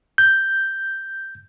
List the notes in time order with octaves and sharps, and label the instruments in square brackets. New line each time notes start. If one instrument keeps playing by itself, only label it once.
[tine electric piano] G6